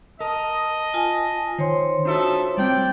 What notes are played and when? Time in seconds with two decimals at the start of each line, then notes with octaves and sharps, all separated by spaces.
0.20 A#4 D#5 A5
0.94 F4 G#5 A5
1.58 D#3 C5 C#5 C6
2.05 D4 D#4 F4 F#4 A4 E5
2.57 G3 C4 D5 G5